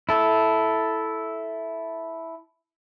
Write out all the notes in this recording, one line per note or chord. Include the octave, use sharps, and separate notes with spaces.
E4 A4